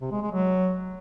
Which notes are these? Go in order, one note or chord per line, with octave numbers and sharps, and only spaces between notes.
C3
G#3
G#3
F#3